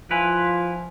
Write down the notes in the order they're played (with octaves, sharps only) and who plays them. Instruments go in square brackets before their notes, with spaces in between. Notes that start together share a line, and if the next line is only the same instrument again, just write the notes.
[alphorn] F3 [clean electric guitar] E4 B4 [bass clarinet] F4 [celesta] G#5 F7